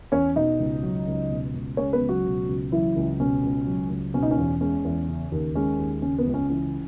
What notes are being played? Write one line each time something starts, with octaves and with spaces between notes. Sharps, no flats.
E2 C#4 C#5
B2 D#4 D#5
C#2
F#3
C#2
B2
C#2
G#3 C#4 C#5
B3 B4
C#2
F#3 F#4
B2
C#2
E3 F#3 E4
C#2
B2 C#4
C#2
F#3
C#2
B2 C#4
D#4
C#4
E2
G#3 C#4
E2
C#3
D#2
G#3 C#4
D#2
C#3 C#4
B3
C#2
C#4
E3 C#4